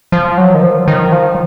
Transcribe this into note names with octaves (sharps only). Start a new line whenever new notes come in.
F3
F#3
D#3
F3
D#3
F3